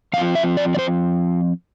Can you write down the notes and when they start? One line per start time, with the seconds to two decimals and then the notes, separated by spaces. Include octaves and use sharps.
0.13 F3 C4 F4 F5
0.35 E5
0.57 D5
0.75 D5
0.79 C5